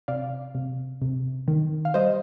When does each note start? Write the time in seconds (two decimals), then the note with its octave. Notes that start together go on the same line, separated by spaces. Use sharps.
0.08 C3 D5 F5
0.55 C3
1.02 C3
1.48 D#3
1.85 F5
1.94 G3 C5 D#5